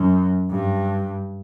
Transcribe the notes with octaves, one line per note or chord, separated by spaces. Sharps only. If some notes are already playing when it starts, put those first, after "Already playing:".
Already playing: F#2
G2